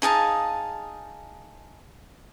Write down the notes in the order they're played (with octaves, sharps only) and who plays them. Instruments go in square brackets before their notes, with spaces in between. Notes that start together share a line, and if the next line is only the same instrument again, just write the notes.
[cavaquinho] D#4 G#4 F5 A5